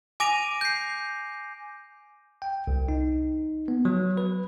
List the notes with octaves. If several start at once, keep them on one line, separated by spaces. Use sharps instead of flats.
G#5 D6 A#6 D7 D#7 F7
G6 C7
G5
C2
D#4
B3
F#3
B4